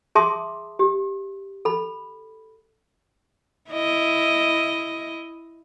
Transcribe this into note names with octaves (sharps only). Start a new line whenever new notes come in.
G#4 E5 A5 C6 D6 D#6
G4
A4 B5
E4 D#5